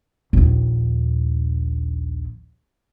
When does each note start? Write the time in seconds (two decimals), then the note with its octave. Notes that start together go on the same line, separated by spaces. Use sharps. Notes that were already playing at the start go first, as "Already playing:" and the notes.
0.33 A#1 D#2